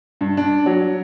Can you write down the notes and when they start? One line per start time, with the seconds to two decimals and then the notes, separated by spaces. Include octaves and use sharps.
0.21 G2
0.37 D4
0.66 F#3